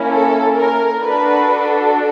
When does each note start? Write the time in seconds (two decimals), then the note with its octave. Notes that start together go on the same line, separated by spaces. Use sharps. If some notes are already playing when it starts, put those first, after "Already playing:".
Already playing: A#3 C#4 E4
0.12 A4
0.58 A#4
1.02 D4 F#4 A4 B4